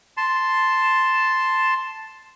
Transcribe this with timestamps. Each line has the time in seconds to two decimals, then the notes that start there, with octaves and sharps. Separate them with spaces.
0.17 A5 C6